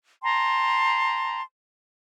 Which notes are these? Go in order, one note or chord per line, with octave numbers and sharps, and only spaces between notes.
G5 A5 A#5 C6